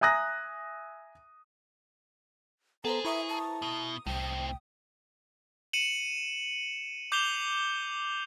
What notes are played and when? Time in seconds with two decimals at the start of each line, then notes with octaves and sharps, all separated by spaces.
0.01 E5 G#5 A#5 D#6 F#6 A#6
2.85 B3 G#4 A4 B4 C5 A#5
3.05 E4 E5 A#5 C#6 D#6
3.29 A5
3.62 B2 D#6
4.07 C2 A2 C4 G5
5.73 C#7 D#7 E7 F#7
7.12 D6 G6 C7 E7 F7 G7